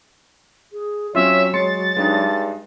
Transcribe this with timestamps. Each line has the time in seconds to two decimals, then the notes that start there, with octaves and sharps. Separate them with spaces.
0.73 G#4
1.15 F#3 C4 C#4 F4 C#5 E5
1.54 G#3 C6 A6 C#7
1.97 G2 G#3 D4 D#4